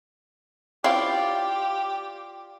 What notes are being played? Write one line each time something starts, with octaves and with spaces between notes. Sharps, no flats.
C4 C#4 E4 F4 G4 D5